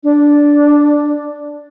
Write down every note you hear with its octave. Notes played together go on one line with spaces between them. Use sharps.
D4